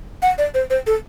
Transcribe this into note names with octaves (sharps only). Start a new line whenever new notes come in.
F#5
D5
C5
C5
A4